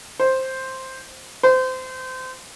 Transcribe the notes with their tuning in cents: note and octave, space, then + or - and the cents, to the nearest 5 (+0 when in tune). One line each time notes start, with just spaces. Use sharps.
C5 +5
C5 -25